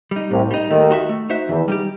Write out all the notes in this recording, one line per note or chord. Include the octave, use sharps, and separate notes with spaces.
G3 D#4
C2 A2 C3
G3 D#4
D#2 D#3 A3
D#4 F#4 C5 E5
A3
D#4 F#4 C5 E5
E2 D#3 E3
G3 D#4 G4